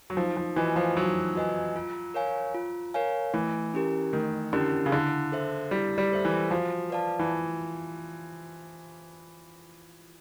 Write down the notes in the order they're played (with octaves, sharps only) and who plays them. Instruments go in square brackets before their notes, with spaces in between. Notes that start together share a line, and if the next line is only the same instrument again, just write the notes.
[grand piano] F#3
[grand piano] F3 [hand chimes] D#4
[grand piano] F3
[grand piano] E3 [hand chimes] F#4 B4 D#5 G#5
[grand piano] F3
[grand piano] F#3 [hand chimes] D#4
[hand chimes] F#4 B4 D#5 G#5
F4
A#4 C#5 F5 G#5
F4
A#4 C#5 F5 G#5
[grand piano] E3 [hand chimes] A3
[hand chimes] C#4 E4 G4 A#4
[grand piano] D#3 [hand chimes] A3
[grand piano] D3 [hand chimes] C#4 E4 G4 A#4
[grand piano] C#3
[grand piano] D3 [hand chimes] E4
[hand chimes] A4 C5 E5
[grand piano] G3 [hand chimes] E4
[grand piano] G3
[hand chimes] A4 C5 E5
[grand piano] E3
[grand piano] F3 [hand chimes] F#4
[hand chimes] B4 D5 F5 A5
[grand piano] E3